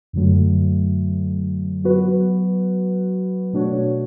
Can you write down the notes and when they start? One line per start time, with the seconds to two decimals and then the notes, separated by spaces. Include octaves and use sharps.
0.13 F#2 D3 F#3 A3
1.84 F#3 B3 F#4 B4
3.53 B2 A3 D4 F#4 C#5